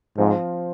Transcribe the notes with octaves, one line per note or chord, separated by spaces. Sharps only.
G#2 F3 C4 F4